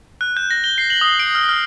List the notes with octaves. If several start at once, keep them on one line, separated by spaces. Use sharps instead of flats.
F#6
G6
A#6
G7
C7
F#7
D#6
D7
F6
F6